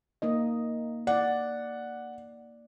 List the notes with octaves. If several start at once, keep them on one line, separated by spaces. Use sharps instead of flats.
A#3 D#4 D#5
D5 F#5